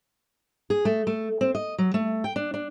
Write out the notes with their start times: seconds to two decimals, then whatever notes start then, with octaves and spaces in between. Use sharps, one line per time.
0.70 G#4
0.85 A3
1.07 A3
1.41 C4
1.55 D#5
1.78 F#3
1.94 A3
2.24 G5
2.36 D4
2.54 D4